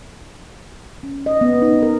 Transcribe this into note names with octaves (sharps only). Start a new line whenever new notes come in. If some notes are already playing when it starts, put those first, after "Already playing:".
C#4
D#5
B3
D#4
A#4